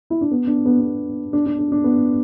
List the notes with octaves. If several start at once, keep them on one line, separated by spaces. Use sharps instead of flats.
E4
D4
B3
D4
B3
B3
D4
D4
D4
D4
B3